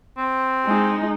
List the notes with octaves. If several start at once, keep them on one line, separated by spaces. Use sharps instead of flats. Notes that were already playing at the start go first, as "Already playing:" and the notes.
C4
G#3 D#4